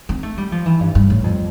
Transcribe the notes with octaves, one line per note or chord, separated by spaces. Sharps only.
C4
A3
G3
F3
E3
G2
G2
A2
F2